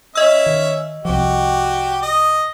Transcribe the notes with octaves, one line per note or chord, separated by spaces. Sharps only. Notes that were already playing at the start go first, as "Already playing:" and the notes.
C#4 D#5 E5 E6
D#3
C2 F3 F#4 G4
D#5